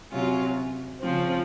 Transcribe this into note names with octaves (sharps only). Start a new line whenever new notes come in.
C3 F#3 C#4 F4
C#3 F3 C4